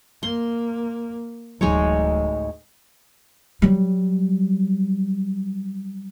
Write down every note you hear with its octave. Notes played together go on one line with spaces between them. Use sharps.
A#3 C6
D1 A1 D2 E3 F#3 G#3 D#4 C#5
F#3 G3